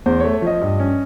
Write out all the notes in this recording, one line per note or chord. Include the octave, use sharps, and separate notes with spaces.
E2 C5
A3 C#5
C#5
F3 D#5
G2
C#4